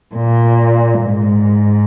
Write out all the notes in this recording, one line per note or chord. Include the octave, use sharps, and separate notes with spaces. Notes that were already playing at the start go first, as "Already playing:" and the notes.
A#2
G#2